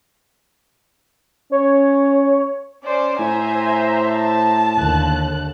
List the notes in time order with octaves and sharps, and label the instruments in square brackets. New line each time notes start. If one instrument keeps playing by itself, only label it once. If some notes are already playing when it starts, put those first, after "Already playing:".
[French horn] C#4 [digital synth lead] C#5
[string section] C#4 C5 [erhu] D5
[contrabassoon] A2 [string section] C5 E5 A#5 [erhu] G#5
[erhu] A5
[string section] D#2 D3 F#6